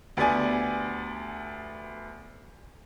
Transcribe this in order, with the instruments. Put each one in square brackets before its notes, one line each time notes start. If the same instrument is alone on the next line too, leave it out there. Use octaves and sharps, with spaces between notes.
[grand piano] D2 B3 G4 D5 G#5